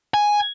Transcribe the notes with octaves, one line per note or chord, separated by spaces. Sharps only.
G#5